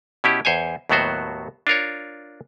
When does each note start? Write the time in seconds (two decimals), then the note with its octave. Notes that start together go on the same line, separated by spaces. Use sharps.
0.24 B2 C#4 E4 G4
0.45 E2 C5 C#5 G#5
0.89 D#2 A2 F#3 B3 F#4 C5
1.67 D4 F4 A#4 C#5